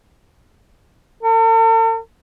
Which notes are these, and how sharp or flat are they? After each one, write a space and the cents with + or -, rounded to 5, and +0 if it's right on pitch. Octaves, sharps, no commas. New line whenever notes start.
A4 +45